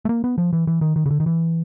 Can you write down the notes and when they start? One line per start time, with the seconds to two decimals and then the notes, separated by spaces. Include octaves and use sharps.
0.05 A3
0.09 A#3
0.24 B3
0.38 F3
0.53 E3
0.67 E3
0.81 D#3
0.96 D#3
1.06 C#3
1.11 D3
1.20 D#3
1.26 E3